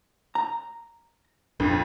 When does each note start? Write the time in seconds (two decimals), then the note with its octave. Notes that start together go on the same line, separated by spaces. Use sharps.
0.35 A#5
1.60 A#1 F2 D4